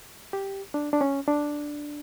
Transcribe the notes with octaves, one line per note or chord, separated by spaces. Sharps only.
G4
D4
D4
C#4
D4